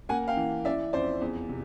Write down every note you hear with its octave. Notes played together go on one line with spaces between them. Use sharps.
A#3 F#5 G#5
F5 G5
E3
E3 D5 E5
F2 C5 D5
E2
C3